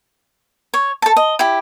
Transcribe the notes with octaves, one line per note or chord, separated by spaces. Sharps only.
C#5
A4 A5
D#5
E4 G4